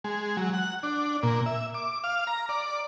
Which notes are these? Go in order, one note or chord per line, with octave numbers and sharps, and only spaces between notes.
G#3
F#3
F#5
D4
A#2
E5
D6
F5
A#5
D5